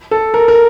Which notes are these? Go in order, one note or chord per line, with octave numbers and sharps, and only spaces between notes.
A4
A#4
A#4